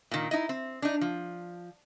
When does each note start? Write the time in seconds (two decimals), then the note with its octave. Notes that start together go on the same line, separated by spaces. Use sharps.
0.11 A#2 D#3
0.31 D#4 E4 D#5
0.49 C4
0.82 D4 D#4
1.01 F3